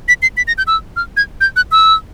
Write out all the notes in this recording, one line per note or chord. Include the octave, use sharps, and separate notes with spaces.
B6
C7
B6
A#6
G6
E6
F6
G#6
G6
F#6
E6